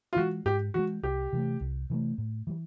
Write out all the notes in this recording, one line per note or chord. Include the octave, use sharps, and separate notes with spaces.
F4
E3 G#3 F#4
G#2 G4
E3 G#3 F#4
C2 G4
C3 E3 A3
C2
C3 E3 A3
A2
E3 G3